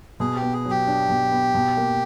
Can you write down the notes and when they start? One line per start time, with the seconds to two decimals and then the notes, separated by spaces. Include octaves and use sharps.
0.20 B2 G#4
0.36 G4
0.42 B3
0.53 G#4
0.65 F#3 G4
0.87 D4
1.10 B2
1.32 B3
1.54 B2
1.77 A#3